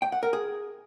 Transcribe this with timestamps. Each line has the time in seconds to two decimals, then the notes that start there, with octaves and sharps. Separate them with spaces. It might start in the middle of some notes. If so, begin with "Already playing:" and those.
0.02 G5
0.12 F#5
0.23 A#4
0.33 G#4